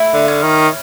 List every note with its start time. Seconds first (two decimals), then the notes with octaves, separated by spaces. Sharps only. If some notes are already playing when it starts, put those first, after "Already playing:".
Already playing: A3 E4
0.13 D3
0.28 C#4
0.42 D#3